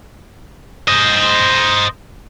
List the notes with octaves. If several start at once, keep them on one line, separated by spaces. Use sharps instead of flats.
C5 D#5